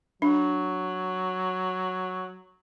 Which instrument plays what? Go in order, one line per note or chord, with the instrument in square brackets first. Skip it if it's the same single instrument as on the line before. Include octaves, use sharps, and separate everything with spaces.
[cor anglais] F#3 [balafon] D4